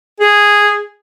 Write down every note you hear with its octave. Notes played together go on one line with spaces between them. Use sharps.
G#4